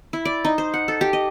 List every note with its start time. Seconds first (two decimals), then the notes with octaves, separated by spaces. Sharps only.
0.13 E4
0.25 D5
0.45 D#4
0.58 C5
0.74 F#5
0.88 A4
1.01 G4
1.13 D#5